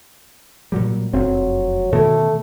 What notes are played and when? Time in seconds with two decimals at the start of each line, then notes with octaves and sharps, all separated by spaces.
0.72 A#2 F#3 G3
1.13 F1 F#2 F#3 C4
1.92 B2 D#3 E3 A3